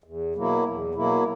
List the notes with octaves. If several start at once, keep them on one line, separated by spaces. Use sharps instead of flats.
E2
B2 F#3 A#3 E4
E2
B2 F#3 A#3 E4